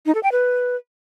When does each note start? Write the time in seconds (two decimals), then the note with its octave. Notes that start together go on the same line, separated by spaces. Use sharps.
0.06 D#4
0.15 A4
0.23 G5
0.32 B4